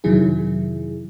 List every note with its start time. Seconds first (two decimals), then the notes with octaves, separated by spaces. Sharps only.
0.04 F2 C3 D#3 F#3 E4 G#4